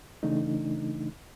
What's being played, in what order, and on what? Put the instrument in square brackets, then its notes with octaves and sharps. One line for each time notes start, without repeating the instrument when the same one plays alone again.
[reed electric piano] C#3 E3 A3 D4 D#4